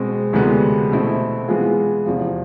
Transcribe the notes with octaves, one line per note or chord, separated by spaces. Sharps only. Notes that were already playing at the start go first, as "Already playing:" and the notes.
Already playing: B2 G#3 C4
D2 C3 E3 G#3 B3
B2 A3 C4 E4
E3 G#3 B3 F4 G#4
E2 C3 F3